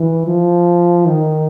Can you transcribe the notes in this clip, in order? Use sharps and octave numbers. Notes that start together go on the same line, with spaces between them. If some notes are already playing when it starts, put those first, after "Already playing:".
Already playing: E3
F3
D#3